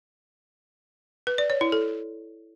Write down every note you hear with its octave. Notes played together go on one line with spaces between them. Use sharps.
B4
D5
C#5
E4
A4